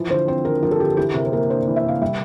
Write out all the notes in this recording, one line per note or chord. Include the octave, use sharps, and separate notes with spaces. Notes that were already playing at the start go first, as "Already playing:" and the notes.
Already playing: E3 F3
D3 C5
C4 C5
D3 A#4
F3 A#4
A4
D3 G4
E3 G4
C3 A#4
C5
A#3 A#4
D4 C5
E3
E5
C3 F5
G3 E5